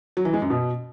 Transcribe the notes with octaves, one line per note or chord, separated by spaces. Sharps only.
F#3
E3
G#3
F#2
B2